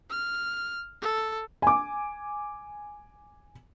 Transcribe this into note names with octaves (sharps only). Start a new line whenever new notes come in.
F6
A4
G#5 D6